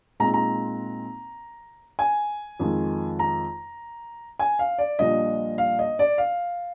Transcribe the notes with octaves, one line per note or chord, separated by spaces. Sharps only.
A#2 G#3 C4 D#4 A#5
A#5
G#5
F2 D#3 G#3
A#5
G#5
F5
D5
A#1 A#2 G3 D4 D#5
F5
D#5
D5
F5